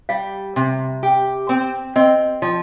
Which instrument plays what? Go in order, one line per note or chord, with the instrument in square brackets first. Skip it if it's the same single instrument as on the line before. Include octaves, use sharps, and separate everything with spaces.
[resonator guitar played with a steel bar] G3 [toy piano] F5
[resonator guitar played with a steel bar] C3
G4
C4
[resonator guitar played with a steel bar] C4 [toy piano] D#5
[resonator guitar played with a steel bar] F3